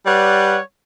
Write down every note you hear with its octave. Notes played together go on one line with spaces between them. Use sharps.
G3 B4 C#5 D5 F#5